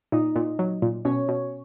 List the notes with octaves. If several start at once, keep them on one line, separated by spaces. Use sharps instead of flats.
A#2 D#4 D#5
A#2
F#3
A#2
B2 C#4 C#5
B2